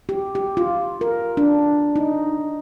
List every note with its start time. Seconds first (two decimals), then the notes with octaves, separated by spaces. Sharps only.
0.09 G4
0.35 G4
0.57 F4
1.01 A#4
1.37 D4
1.96 D#4